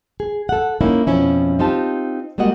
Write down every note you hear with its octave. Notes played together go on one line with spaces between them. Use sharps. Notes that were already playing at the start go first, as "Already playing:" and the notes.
G#4
A4 F#5
A#3 C#4 D#4 E4
F2 B2 F3 C#4 E4
C4 D#4 F4 G4 A5
G3 G#3 A#3 F#4 D#5 F#5